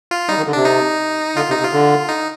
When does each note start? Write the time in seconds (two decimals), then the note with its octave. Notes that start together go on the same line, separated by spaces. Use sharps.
0.11 F4
0.29 G3 D#4
0.38 D#3
0.47 D3
0.53 C3 D4
0.65 D#4
1.36 D3 F4
1.49 C3 D#4
1.60 C3
1.64 F4
1.73 D3
2.09 D#4